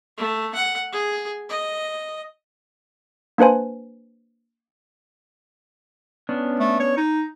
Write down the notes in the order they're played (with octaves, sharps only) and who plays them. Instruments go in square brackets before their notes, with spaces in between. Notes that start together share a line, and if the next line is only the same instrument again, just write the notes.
[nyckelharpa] A3
F#5
G#4
D#5
[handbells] A#3 D4 B4 C5 G#5
[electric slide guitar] B3 C#4 D4
[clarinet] A3
C#5
D#4